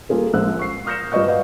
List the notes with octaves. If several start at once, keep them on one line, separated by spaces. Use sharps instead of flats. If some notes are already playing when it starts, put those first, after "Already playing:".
G3 A#3 F4 G#4 A4
A#1 G#3 E6 F#6
C#6 C7
D#6 F6 G6 A#6 C#7 E7
G2 F4 B4 D#5 C#6 G6
B4 D5 D#5 F5 F#5